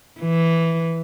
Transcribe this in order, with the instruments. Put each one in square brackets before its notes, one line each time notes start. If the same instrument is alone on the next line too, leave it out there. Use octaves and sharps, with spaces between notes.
[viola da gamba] E3